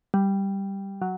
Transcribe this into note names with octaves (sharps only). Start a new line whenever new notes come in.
G3
F#3